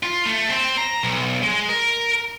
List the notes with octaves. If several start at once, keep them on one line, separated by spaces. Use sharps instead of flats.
F4
A3
C4
A#5
B1
G#3
A#4